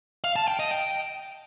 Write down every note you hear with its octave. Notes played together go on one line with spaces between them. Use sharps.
F5
A5
G5
D#5
G5